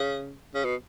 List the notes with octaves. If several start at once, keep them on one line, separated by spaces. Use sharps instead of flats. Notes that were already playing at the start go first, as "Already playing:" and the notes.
Already playing: C#3
C#3
B2